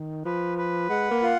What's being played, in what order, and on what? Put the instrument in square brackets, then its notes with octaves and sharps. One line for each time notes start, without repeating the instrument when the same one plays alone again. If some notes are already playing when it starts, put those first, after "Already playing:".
Already playing: [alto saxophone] D#3
[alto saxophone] F3 [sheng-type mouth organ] B4
[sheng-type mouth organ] B4
[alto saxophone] G#3 [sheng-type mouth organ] F#5
[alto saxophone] A#3
[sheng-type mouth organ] F4